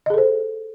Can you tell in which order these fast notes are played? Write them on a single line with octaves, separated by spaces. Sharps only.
D#5 G#4 A4 C5